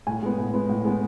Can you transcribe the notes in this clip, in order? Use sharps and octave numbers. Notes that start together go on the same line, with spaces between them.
A2 G#5
G#3 B3
A2
G#3 B3
A2
G#3 B3